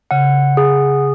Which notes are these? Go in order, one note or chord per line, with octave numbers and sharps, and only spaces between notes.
C#3 F#5
G#4